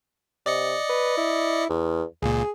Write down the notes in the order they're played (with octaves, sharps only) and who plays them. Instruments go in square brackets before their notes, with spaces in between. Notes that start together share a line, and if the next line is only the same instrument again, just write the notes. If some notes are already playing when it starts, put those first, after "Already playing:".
[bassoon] C3 [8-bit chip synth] D5 D#5 C#7
[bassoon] B4
E4
E2
[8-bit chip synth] C#2 A#2 [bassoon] G#4